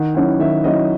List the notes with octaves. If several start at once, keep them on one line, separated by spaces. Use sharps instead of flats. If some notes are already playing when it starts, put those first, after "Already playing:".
Already playing: D#3 F#5
F#3 C#4 E4 F#5
D#3 E5
F#3 C#4 E4 D#5